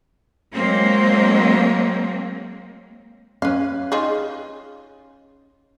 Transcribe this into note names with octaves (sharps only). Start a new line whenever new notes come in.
F#3 G#3 A#3 C4
C#4 B4 F5
D#4 F4 G#4